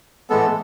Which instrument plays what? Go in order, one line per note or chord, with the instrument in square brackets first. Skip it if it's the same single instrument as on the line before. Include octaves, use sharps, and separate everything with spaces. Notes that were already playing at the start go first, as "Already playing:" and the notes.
[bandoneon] A2 E3 G#3 B3 A4